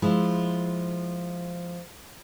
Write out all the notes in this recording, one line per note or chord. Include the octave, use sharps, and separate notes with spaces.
F3 G#3 E4